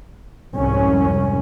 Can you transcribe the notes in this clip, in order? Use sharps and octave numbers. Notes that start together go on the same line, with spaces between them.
C2 F2 G#2 C#4